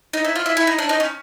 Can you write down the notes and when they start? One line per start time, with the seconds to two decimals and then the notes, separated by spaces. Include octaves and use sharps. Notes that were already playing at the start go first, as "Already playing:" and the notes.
0.13 D#4
0.25 E4
0.35 F4
0.46 E4
0.57 E4
0.67 D#4
0.78 D4
0.89 D#4
1.00 C#4